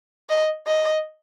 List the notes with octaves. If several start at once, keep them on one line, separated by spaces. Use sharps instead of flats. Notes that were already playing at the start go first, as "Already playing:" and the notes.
D#5
D#5